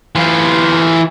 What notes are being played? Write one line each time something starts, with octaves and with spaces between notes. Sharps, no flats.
E3 F4